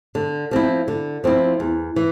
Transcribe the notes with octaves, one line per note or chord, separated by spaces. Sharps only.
D3
F3 C4 E4
D3
F3 C4 E4
E2
E3